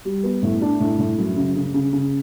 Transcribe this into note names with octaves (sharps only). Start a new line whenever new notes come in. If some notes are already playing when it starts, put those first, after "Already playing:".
G3
B3
A2
D4
A2
A2
F#2
C#3
C#3
C#3
C#3